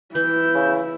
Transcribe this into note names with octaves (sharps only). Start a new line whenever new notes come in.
E3 E4 G6
C#3